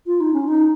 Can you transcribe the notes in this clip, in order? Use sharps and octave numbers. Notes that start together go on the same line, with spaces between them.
F4
D#4
C#4
D#4